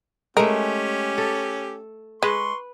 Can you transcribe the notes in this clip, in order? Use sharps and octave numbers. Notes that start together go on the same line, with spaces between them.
G#3 A3 C#4 G4 A#4
A4
G#3 B4 C6 C#6